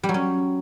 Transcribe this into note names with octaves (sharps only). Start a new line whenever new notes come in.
G3
F#3
C#4